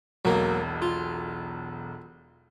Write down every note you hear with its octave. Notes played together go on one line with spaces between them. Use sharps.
E1 B1 F#3 A#3
F4